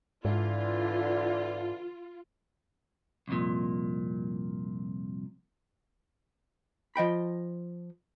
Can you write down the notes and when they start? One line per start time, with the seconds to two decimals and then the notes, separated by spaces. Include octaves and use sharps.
0.25 G#2 D3 E3 F4
3.28 C2 F2 A#2
6.96 F3 D#5 G5 B5